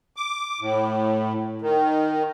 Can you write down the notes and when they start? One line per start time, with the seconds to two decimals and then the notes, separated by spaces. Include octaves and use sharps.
0.16 D6
0.61 A2
1.62 D#3